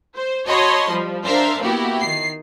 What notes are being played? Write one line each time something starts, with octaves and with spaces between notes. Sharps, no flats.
C5
F#4 C#5 D#5 A5 B5 C6
F3 G3
D4 A#4 C5 E5 F5
A#3 B3 E4 F#4 G4
D#3 C7